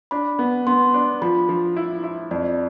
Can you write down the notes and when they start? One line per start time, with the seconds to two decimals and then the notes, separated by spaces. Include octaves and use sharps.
0.11 D4 B5
0.39 B3
0.67 B3 C6
0.94 D4
1.22 F3 B5
1.49 F3
1.76 E4
2.04 E4
2.31 F2 D5